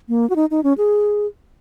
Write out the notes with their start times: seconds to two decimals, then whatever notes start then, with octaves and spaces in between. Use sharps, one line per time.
0.09 A#3
0.30 F#4
0.36 D#4
0.51 D#4
0.64 C#4
0.78 G#4